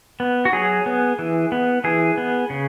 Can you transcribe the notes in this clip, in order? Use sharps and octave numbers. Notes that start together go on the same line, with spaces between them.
B3
F#4
F#3 G#4
B3
E3
B3
E3 G#4
B3
C#3